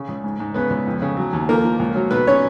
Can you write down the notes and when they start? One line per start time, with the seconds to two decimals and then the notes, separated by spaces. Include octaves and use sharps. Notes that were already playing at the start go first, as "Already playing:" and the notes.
Already playing: C#3
0.08 C#2
0.24 G#2
0.40 G#2
0.54 C#3 B3 B4
0.70 C#2
0.87 F2
1.02 C#3
1.17 F#3
1.33 D#2
1.49 F3 A#3 A#4
1.64 F3
1.79 C#2
1.95 F#3
2.11 B2 B3 B4
2.27 F#3 C#4 C#5